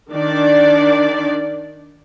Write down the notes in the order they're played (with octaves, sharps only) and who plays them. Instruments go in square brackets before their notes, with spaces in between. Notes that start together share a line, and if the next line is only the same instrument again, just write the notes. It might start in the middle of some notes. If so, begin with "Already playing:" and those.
[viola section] D#3 D4 D5